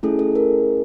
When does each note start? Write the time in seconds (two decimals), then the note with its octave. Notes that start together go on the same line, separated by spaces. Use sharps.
0.03 A3 C#4 E4 G#4 A4
0.19 A4
0.35 A#4